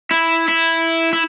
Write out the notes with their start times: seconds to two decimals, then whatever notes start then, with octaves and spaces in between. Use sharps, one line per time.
0.11 E4
0.48 E4
1.13 E4